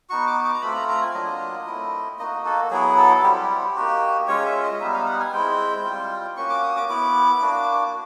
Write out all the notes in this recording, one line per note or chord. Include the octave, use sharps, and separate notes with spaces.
B3 D#4 F#4 C#6
D6
D6
A#5
A3 C4 F4 B5
A#5
A#5
G#5
F#3 A#3 D4 F4 D#5
A3 C4 E4
A#3 D#4 F#4 D#5
A4
F#3 B3 E4 G#4
A4
G3 C4 E4 G4
A#3 D#4 F#4
G#3 C#4 F4 C#5
E5
D#5
G3 B3 D#4 E5
F5
F#5
G#5
G#3 C4 E4 G5
G3 C4 F4
A#3 C#4 F#4 C#6
D6
D#6
D6
B3 E4 D6
A#3 D4 F#4